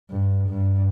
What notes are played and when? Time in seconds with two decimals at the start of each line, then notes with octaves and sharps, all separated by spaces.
0.11 G2
0.49 G2